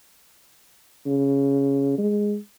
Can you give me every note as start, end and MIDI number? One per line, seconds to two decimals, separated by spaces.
1.06 1.97 49
1.98 2.37 56